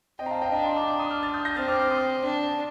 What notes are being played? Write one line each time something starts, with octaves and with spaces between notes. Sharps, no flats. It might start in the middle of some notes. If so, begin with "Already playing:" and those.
C4 D#5 G5
A#5
F5 A5
D#5 G5
D4 G5 A#5
A5 C6
A#5 D6
A#5 D6
C6 D#6
D6 F6
F6 A6
D#6 G6
G6 A#6
C4 F6 A6
D6 F6
D6 F6
C6 D#6
D4